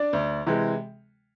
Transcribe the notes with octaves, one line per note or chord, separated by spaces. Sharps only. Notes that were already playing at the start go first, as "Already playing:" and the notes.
Already playing: D4 D5
D2
C3 E3 G#3